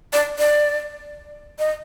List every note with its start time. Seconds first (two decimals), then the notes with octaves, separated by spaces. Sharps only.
0.13 D5
0.39 D5
1.59 D#5